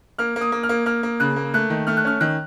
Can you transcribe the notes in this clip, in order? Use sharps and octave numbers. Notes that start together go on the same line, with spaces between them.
A#3 F6
A#3
D#6
A#3
F6
A#3
A#3 F6
A#3
C#3 F#6
A#3
A3 F#6
D#3
A3 F6
F#6
C#4 F6
D#3 F#6